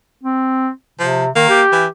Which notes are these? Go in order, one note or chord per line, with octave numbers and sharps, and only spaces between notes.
C4
C3 F3
D#3 A#3
G4
E3